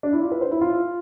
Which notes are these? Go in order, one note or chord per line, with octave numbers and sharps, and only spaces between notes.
D4
E4
F4
B4
C5
E4
F4